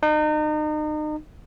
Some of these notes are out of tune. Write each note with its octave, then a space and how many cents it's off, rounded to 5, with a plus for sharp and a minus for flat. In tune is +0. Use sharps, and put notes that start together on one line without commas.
D#4 -35